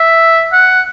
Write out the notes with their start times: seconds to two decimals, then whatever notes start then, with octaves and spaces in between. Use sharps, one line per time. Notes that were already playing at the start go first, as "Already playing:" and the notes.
Already playing: E5
0.53 F#5